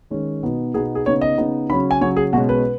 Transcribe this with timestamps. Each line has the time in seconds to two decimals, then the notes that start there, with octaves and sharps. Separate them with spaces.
0.11 D#3 G#3 C#4
0.43 B2 B3 D#4
0.74 B2 B3 D#4 G#4
0.95 G#4
1.06 C#3 B3 D#4 C#5
1.21 D#5
1.38 C#3 B3 D#4
1.69 C#3 F#3 C#4 B5
1.91 G#5
2.01 C#3 F#3 C#4 C#5
2.16 G#4
2.33 B2 G#3 C#4 F#4
2.49 B4